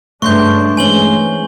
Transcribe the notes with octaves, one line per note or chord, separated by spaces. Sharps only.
G2 C#3 G#3 A3 D4 C6 C#6 G6
E3 G#3 C4 C#4 G#5 F#7 G7